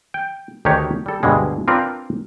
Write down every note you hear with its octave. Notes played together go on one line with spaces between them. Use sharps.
G5
D2 D#3 D4 D#4 G4 C#5
G3 A4
D2 G2 B2 D3 G#3
C4 D4 F4 A#4 B4 D5